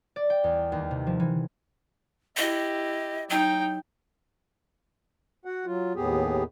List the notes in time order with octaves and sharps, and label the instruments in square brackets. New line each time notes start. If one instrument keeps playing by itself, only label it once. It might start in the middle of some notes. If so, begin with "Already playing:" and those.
[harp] D5
G5
E2
D#2
C3
F3
E3
[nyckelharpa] E4 G4 [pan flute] D#5
[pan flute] F#3 [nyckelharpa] D#4 G5
[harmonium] F#4 F#5
F#3 F4
D#2 A2 B3 G4 G#4